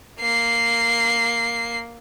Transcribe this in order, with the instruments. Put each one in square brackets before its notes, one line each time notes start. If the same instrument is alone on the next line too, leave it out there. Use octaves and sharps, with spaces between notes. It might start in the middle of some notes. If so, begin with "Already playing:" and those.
[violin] A#3 C7